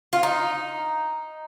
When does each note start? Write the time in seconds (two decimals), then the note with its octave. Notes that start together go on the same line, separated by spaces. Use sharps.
0.13 F4
0.23 D#4